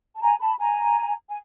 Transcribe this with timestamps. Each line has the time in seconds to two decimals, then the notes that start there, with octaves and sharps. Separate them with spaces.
0.15 A5
0.21 G#5 A#5
0.40 A5 B5
0.59 G#5 A#5
1.29 G#5